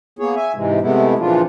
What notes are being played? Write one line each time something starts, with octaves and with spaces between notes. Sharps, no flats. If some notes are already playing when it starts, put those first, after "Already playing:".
A#3 B3 G#4 C#5
E5 G#5
G#2 C3 E3 G#3
C3 G#3 A3 B3 E4
A#2 C#3 E3 F3 D4 F4